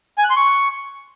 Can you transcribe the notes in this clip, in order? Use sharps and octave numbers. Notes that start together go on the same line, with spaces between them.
G#5
F#6
C6
C#6